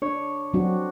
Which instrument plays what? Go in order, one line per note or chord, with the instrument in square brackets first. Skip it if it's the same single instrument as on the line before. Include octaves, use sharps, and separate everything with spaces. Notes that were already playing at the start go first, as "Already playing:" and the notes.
[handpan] D4 [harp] C#5
[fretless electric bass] F#3 [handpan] C4 D4 F#4